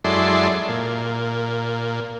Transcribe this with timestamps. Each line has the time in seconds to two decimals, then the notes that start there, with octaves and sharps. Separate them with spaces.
0.04 F#2 G#3 E4 A4 D5 C6
0.69 A#2